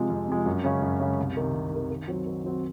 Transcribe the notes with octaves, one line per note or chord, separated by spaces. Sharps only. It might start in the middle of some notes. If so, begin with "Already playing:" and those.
Already playing: C3 F3 G#3
F2
C3 F3 G#3
F#2
C#3 G#3 C#4
F#2
C#3 G#3 C#4
C2
C3 D#3
C2
C3 D#3
D#3
F#3 C4 F#4
D#3
F#3 C4 F#4